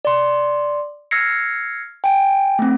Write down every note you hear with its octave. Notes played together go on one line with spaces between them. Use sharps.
D5 C6
E6 F6 G#6 A#6 C7 C#7
G5 G#5
A3 C4